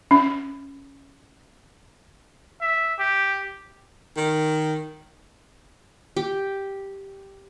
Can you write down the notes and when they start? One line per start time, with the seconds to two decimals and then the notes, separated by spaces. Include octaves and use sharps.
0.11 C#4
2.61 E5
2.99 G4
4.17 D#3
6.17 G4